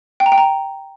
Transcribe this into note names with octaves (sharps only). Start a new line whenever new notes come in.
G5
A#5
G5
A#5